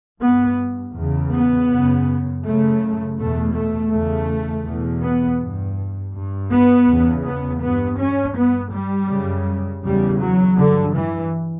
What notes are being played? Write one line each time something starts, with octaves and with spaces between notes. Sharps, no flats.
G2 B3
E2 C#3
B3
F#2 C#3
F#2 C#3 A3
E2 B2 A3
A3
E2 C#3 A3
E2 B2
B3
G2
G2
B3
E2 C#3
B3
G2 B3
C#4
G2 B3
G3
F#2 C#3
E2 C#3 G3
F#3
G2 D3
E3